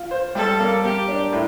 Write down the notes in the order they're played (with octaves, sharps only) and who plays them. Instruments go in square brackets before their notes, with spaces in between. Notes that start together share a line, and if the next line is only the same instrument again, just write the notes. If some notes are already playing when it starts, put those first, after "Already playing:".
Already playing: [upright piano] F4
C5
[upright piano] G3 [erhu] A4
[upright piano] A#3
[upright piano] A#3 [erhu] G4
[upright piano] D4
A2